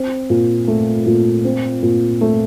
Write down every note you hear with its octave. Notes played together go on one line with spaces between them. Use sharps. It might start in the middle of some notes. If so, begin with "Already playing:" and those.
Already playing: C4
A#2
A3
A#2
C4
A#2
A3